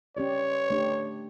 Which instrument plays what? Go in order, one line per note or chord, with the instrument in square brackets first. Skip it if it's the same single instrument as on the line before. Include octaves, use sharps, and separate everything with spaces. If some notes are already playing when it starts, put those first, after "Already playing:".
[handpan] C#4 G4 D5 [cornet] C#5
[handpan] A3 D4 G4